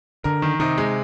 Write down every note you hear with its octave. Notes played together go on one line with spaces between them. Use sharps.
D3 A#4
D#3
C3 D#4
G#3